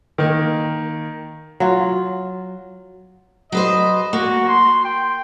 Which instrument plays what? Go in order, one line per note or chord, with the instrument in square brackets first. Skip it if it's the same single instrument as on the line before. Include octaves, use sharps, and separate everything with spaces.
[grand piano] D#3 A#3
[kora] F#3 F4
[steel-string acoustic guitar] F#3 B4 C5 [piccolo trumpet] D#5
[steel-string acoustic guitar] A#3 [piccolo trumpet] F#4
[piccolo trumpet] C6
G5